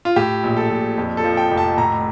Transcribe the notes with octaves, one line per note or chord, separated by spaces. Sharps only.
F4
A2 G4
A#1
A4
A#1
F2
A4
F3
G5
F1
A5
A2 A#5